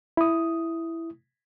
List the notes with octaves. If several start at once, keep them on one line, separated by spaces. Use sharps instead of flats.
E4 D#6